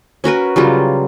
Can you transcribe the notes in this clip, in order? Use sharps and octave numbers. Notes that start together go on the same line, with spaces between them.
C#4 F#4 A#4 B4
C#3 F#3 G3 F4